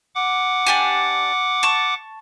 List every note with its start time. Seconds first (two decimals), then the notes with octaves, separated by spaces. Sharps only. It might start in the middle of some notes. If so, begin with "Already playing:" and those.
0.15 F#5 D6
0.67 D4 G4 G#5
1.63 A5 C#6